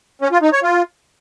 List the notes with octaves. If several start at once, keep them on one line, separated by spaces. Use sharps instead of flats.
C#4
F4
D#4
C#5
F4